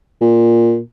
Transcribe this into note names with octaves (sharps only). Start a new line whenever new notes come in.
A#2